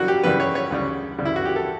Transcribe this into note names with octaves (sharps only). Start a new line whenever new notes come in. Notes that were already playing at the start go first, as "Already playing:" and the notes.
Already playing: F#2 C#3 E3 G3 F#4
G4
F#2 C#3 E3 G3 B4
C#5
C#5
D2 C#3 G3
D2 C#3 G3
E4
F#4
G4
A4